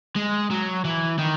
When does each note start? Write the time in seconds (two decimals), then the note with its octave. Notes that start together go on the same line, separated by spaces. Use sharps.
0.16 G#3
0.51 F#3
0.85 E3
1.19 D#3